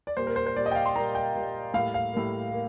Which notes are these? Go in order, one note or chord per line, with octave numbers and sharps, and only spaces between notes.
D5
A#2 G3 A#3 C5
A#4
C5
C5
A#2 G3 A#3 D5
D#5
G5
F5
C6
A#2 G3 A#3 A#5
G5
A#2 G3 A#3
A2 G3 A#3 F5
F5
A2 G3 A#3
A#3